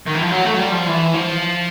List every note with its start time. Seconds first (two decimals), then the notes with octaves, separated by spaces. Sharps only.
0.06 D#3
0.15 E3
0.22 F3
0.31 F#3
0.45 A3
0.54 F#3
0.59 G3
0.72 F3
0.87 E3
1.14 F3